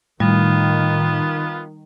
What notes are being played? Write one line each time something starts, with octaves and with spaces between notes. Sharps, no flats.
A2 D#3 G3 B3 F4